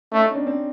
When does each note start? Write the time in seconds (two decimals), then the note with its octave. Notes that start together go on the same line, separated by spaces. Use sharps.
0.12 A3 C#4 D#4
0.24 C#4 D#4
0.35 C4 D4
0.47 C4 D4